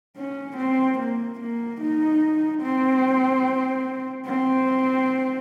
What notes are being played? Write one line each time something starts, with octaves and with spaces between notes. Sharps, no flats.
C#4
C4
A#3
A#3
D#4
C4
C4